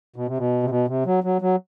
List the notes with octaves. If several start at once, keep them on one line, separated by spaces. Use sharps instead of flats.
B2
C3
B2
C3
B2
C3
F#3
F#3
F#3